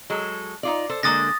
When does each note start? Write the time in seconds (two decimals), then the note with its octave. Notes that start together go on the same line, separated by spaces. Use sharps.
0.10 F#3 G#3 A4
0.63 D#4 F4 D5
0.89 A4 C5
1.03 D3 G#3 A#3 D#6 A6 A#6